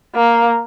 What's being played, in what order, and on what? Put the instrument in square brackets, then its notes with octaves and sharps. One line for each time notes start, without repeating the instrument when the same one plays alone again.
[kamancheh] A#3